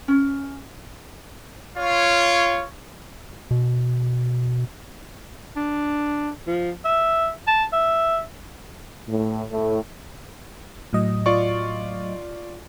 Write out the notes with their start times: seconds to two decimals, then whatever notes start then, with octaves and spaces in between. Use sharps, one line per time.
0.08 C#4
1.77 F4 C#5
3.51 B2
5.56 D4
6.47 F3
6.85 E5
7.47 A5
7.73 E5
9.08 A2
9.51 A2
10.93 A2 F#3 D#5
11.26 F4 D5 C#6